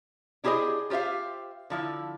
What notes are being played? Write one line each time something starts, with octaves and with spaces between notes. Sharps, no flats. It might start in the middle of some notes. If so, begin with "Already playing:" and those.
D4 E4 G4 G#4 C5 D#5
F4 G4 C5 E5 F5
D3 F3 E4